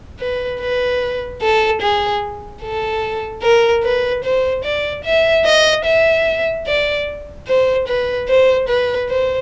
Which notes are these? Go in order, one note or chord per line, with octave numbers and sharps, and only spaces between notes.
B4
B4
A4
G#4
A4
A#4
B4
C5
D5
E5
D#5
E5
D5
C5
B4
C5
B4
C5